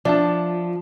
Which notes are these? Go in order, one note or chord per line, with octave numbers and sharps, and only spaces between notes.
F3 D4 E5 A5